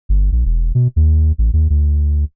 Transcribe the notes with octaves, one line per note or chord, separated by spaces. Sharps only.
G1
A#1
E1
B2
D#2
A1
D#2
D2